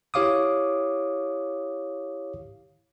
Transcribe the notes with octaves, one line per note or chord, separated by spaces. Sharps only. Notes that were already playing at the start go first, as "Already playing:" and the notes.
E4 G4 C#5 F5 D6 D#6